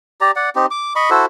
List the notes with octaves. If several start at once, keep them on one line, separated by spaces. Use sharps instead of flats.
G4 D5 A#5
D5 F#5
C4 D#4 G4
D6
D#5 B5 C#6
E4 F#4 A4 C5